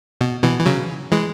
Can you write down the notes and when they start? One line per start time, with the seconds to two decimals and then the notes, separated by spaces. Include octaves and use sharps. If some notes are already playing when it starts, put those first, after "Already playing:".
0.21 B2
0.43 B2 E3
0.59 E3
0.66 C#3 F#3
1.12 E3 G#3